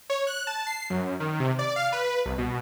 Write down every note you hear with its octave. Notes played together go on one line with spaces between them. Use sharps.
C#5
F#6
A5
C7
F#2
D#3
C3
D5
F5
B4
C2
B2